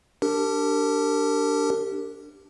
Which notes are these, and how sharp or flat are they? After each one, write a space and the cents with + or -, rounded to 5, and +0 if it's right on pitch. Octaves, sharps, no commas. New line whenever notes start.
D4 +0 G4 +0 A#4 -35